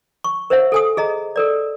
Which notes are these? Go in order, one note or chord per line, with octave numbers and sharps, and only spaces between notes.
C#6
A#4 C5 C#5 E5 F#5
A4 G#5 D#6
G#4 D#5 A#5
A4 A#4 D5